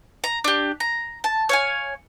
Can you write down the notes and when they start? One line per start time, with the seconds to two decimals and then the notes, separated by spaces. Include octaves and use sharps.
0.24 A#5
0.44 D4 G4
0.80 A#5
1.24 A5
1.49 C#5 F5 G#5